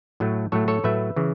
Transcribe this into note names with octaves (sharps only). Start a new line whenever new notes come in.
A2 F#3 A3
A2 F#3 A3 A4 C#5
A4 C#5
A2 F#3 A3 B4 E5
C#3 E3